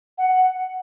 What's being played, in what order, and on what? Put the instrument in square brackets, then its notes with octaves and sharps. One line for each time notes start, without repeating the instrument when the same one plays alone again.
[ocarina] F#5